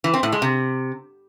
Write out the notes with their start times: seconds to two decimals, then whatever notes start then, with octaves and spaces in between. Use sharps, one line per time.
0.04 E3
0.14 C4
0.23 A2
0.32 G#3
0.42 C3